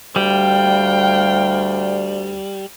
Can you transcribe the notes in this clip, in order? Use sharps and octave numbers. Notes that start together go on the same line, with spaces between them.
D2 G3 F5 G5